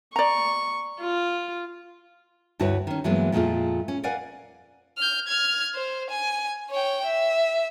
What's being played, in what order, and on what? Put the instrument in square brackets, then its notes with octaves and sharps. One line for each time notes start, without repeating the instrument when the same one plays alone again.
[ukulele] D5 A#5 [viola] C#6
[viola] F4
[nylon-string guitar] D2 G2 E4 F#4 B4 C#5
D#3 C#4
G2 E3 F#3 G#3 A#3 B3
F2 A#2 G#3 A3 F4
C#4
A#4 B4 D5 F5 F#5 G#5
[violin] F6 G6
F6 G#6
C5
G#5
C#5 G5
E5